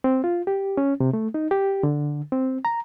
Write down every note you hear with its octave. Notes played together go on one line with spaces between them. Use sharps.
C4
F4
G4
C#4
C3
A3
D#4
G4
D3
C4
A#5